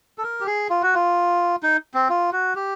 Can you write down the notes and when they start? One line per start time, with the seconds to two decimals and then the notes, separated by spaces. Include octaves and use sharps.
0.18 A4
0.23 A#4
0.40 G4
0.47 G#4
0.70 F4
0.82 F#4
0.94 F4
1.63 D#4
1.94 C4
2.09 F4
2.33 F#4
2.56 G4